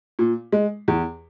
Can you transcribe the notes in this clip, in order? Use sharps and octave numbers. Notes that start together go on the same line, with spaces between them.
A#2
G#3
E2